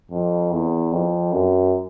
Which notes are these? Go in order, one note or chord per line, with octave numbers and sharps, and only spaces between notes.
F2
E2
F2
F#2